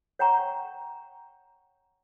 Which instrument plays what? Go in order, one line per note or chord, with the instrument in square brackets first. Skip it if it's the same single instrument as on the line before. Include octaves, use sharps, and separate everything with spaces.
[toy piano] C#5 F#5 G5 A#5 C#6